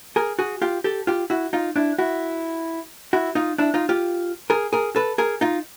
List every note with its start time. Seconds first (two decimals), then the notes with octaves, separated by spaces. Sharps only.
0.16 G#4 A#4
0.39 F#4 G#4
0.62 F4 G4
0.84 G4 A4
1.07 F4 G4
1.30 E4 F#4
1.53 D#4 F4
1.76 D4 E4
1.99 E4 F#4
3.13 E4 F#4
3.35 D#4 F4
3.58 D4 E4
3.74 D#4 F4
3.89 F4 G4
4.50 G#4 A#4
4.73 G#4 A#4
4.96 A4 B4
5.18 G#4 A#4
5.41 D#4 F4